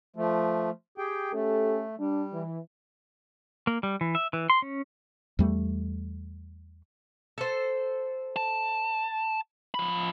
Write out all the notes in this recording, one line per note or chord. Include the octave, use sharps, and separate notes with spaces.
F3 A3
G4 G#4 G5
A3 C#4 G4 A4
G3 D4
E3
A#3
G3
E3
E5
E3
C6
C#4
E2 G3 A3
A4 C5
A5
F3 B5